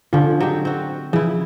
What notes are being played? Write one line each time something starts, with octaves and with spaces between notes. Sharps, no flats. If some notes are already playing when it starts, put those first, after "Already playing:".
D3 F3 C#4 F4
F#3 G#3 G4
C4 F#4
C#3 E3 F3 E4